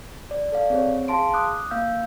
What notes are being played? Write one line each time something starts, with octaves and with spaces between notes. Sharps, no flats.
D5
A4 D5 F5
C4 G#4 C#5
G#4 F5 A5 C6 D7
D6 D#6 F#6
A#3 F5 E6 G6